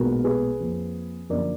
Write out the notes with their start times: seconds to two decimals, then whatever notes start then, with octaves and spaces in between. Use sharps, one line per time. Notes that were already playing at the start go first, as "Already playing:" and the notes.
Already playing: B1 A#2 G#3 B3 F#4 A#4
0.24 G#4 B4
0.59 F2 F3 A#3
1.29 F#2 D3 F3 A#3 A#4 D5